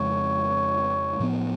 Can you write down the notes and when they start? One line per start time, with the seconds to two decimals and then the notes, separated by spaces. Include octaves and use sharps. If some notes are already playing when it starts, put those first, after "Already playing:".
Already playing: F2 C#3 F3 G#3 C#5
1.20 A2 F3 B3